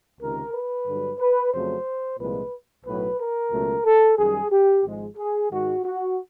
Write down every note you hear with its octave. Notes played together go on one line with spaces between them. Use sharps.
C#2 C3 D#3 A#4
B4
G2 D3 F#3
B4
F2 C#3 F#3 A3 C5
C2 A#2 F3 G#3 B4
B1 A2 F#3 B4
A#4
C#2 B2 F#3 A3
A4
F#2 D#3 G3 G#4
G4
G#1 G#2 F3 G#3
G#4
G#2 D#3 G#3 F#4
F#4